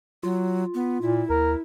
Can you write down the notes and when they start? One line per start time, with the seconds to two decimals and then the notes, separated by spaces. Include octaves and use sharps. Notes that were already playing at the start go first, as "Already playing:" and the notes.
0.23 F#3 F4
0.75 B3
1.02 A#2 E4
1.30 D#2 A#4